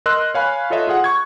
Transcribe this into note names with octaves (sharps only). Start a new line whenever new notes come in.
A#4 D#5 C6 E6 F#6
C#5 F5 G#5 B5
F4 A4 C#5 D#5 E5
F4 G#4 F#5
C#6 G#6